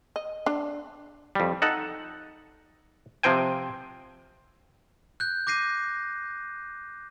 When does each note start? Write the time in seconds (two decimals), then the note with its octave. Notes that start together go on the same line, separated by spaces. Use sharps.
0.16 D#5
0.46 D4
1.35 F2 G3
1.62 D#4 A4 F#5
3.23 C3 F3 C4 C5 G5 G#5
5.20 F#6 G6
5.47 D6 G6 A#6 C7 D#7